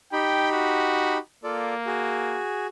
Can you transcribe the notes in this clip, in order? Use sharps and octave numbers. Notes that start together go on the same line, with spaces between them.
D#4 G4 G5 B5
F#4
A#3 F4 A4 D5
F#4 G#4